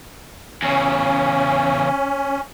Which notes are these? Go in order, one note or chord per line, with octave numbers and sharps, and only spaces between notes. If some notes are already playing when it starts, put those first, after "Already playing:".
E2 C#3 C#4